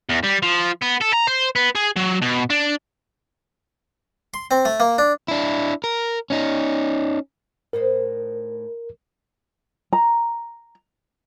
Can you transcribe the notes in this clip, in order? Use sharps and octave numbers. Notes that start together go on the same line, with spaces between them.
E2
G3
F3
B3
A4
A#5
C5
B3
G#4
F#3
B2
D4
C6
C4
A3
A#3
D4
D4 E4
A#4
C#4 D#4
A2 D#4 A#4 C5
A#5